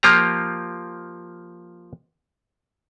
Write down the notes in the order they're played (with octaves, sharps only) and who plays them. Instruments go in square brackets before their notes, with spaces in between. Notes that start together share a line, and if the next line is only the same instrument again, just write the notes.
[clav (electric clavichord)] F3 A#3 F4 G4 A#5